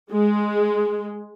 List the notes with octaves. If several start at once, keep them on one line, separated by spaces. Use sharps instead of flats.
G#3